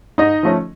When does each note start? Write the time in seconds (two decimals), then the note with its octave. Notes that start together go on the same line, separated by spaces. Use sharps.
0.18 G#2 D#4 D#5
0.43 F3 A3 C#4